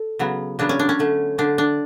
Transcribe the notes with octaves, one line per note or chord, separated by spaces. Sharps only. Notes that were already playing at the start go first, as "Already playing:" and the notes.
Already playing: A4
C#3 F#3 B3
C#3 F#3 B3 D4
C#4
D4
C#4
D3 A3
D3 A3 D4
D4